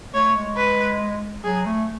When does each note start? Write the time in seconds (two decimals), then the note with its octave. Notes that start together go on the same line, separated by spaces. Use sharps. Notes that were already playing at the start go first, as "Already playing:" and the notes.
0.14 A3 C#5
0.36 G#3
0.57 B4
1.43 F#3 G#4
1.66 A3